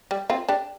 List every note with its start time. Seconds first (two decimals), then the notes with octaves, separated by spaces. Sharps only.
0.11 G3
0.30 C4 F4
0.49 D4 G4